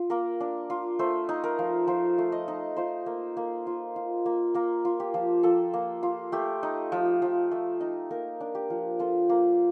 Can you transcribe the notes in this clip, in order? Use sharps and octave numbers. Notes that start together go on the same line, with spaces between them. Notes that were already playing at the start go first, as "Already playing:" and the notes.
Already playing: F4
A#3 A#4
D4
F4
A3 C5
D#4
A#4
F3
F3 C5
A3
D#5
D#4
F4 C5
A#3
A#3
F4
F4
A#3
A#3 A#4
F4
G4
F3
F3 A4
A#3
F4
A3 G4
D#4
F3
F3
A3
D#4
A#3 A#4
D4
G4
F3
F4 A4
A#3